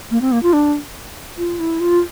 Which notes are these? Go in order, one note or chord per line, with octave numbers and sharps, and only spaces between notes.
A#3
C4
A#3
F4
D4
F4
E4
F4